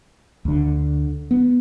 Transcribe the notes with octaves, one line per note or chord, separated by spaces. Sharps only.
D2 D3
B3